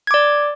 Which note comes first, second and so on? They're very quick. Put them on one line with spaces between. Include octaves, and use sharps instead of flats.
G#6 D6 D5